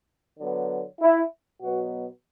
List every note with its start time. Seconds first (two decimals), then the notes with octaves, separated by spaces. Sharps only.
0.40 D3 F#3 B3
1.02 E4
1.62 B2 F#3 B3 F#4